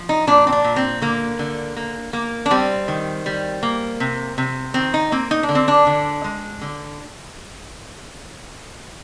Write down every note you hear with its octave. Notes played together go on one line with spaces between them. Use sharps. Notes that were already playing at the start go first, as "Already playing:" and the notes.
Already playing: F3
D#4
A#2 D4
C4
D4
A#2
C4
D3 A#3
D3
A#3
A#3
D4
G3 C4
D#3
G3
A#3
C3
C3
D#3 C4
D#4
A#3 C4
D#4
D4
D3
C4
D4
D3
G#3
D3